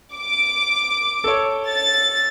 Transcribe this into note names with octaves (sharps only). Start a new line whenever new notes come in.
D6
A4 C#5
A6